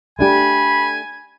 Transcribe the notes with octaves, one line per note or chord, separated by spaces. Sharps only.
A3 D4 G4 G#5 B5